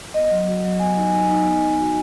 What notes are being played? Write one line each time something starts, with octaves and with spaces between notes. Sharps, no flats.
B3 D#5
F#3
F#4
F#3
B3 G#5
D#4
D#4
D#4
B3
D#4
F#4